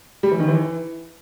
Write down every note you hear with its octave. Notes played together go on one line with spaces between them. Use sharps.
G3
E3
D#3
E3